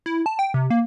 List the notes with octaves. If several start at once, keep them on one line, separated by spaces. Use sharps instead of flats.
E4
A5
G5
C3
A#3